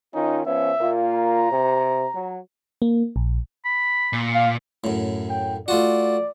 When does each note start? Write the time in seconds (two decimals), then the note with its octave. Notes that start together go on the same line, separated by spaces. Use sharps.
0.14 D#3 C#4 D#4 F4
0.46 F3 B3 C#4 E5
0.81 A#2 A#3 F4
1.14 A#5
1.52 C3
2.15 F#3
2.82 A#3
3.16 A#1
3.65 B5
4.13 A#2
4.35 F5
4.84 F#2 A2
5.30 G5
5.68 A3 F4 F#4 D5